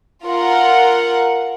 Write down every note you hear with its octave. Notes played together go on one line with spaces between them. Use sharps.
F4 A#4 F#5